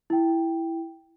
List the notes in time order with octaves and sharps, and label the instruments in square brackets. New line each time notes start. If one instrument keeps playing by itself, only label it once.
[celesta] E4 G5